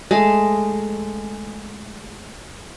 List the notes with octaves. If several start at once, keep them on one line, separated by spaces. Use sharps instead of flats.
G#3 A3